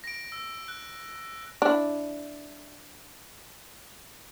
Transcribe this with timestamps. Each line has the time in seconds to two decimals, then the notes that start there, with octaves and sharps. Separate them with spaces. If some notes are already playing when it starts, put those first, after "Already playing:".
0.04 A#6 D7
0.32 E6
0.68 F#6
1.62 D4 E4